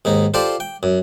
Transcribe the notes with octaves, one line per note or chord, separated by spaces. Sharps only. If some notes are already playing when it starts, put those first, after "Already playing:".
D#2 G#2 D#4
F4 G4 A4 C5 D5
G5
F#2